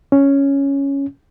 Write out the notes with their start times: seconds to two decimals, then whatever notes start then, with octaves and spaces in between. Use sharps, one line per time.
0.12 C#4